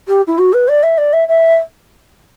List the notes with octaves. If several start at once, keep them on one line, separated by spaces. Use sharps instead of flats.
G4
E4
F#4
B4
D5
E5
D5
E5
E5